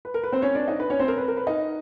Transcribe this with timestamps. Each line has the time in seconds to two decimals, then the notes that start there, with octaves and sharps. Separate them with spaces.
0.05 B4
0.14 A#4
0.24 B4
0.32 C4 C5
0.42 C#4 C#5
0.55 D4 D5
0.67 D#4 D#5
0.80 B4
0.90 C#4 C#5
1.00 C4 C5
1.08 A#4
1.18 B4
1.28 A#4
1.37 B4
1.47 D#4 D#5